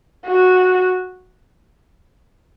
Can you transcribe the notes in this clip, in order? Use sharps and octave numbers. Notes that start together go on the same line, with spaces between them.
F#4